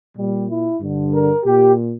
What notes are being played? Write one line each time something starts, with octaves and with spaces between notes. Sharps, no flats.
A#2 G3
E4
G2 D3
A#4
A#2 G4